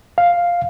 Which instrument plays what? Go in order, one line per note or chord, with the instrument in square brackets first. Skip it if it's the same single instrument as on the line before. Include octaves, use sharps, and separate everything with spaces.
[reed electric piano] F5